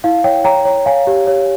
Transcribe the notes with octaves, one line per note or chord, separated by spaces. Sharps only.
E4 F5
C#5 G5
C#5 G5 A#5
C#5
C#5 F5 G#5
G4
C#5